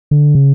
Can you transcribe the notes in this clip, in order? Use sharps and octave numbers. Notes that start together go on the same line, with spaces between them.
D3
C#3